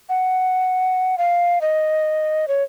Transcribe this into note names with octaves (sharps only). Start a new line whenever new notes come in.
F#5
F5
D#5
C#5